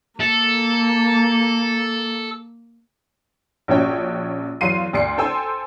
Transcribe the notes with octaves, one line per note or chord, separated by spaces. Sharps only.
A#3 A4
A#1 C#4 F#4 C#5 G5
E2 F#3 F5 C6 C7 D#7
D2 D5 C6 C7 C#7
A4 C5 G5 G#5 C6 E6